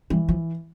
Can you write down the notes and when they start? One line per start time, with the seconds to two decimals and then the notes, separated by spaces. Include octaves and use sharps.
0.10 E3 G3
0.28 F3